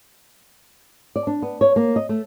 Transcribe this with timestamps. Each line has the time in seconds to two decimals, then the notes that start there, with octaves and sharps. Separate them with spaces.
1.16 D5
1.27 D4
1.42 B3
1.61 C#5
1.76 A#3
1.96 D#5
2.09 A3